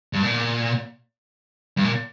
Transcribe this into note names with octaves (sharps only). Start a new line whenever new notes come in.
G2
A#2
G2
A#2